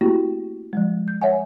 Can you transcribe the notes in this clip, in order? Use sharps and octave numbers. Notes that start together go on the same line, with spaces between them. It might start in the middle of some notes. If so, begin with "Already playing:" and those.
A3 A#3 C4 E4 F#4 G4
F3 G3 G#3
G6
C#5 E5 F#5 G#5